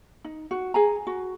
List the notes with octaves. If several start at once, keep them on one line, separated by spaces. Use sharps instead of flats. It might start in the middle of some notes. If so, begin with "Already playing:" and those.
D#4
F#4
G#4 G#5 A#5
F#4